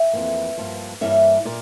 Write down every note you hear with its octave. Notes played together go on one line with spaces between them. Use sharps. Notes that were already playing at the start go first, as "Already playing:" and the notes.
Already playing: E5 G5
F2 E3 A#3
G2 F3 A#3
G2 E3 G3 A#3 C#5 E5
A#2 A#4 D5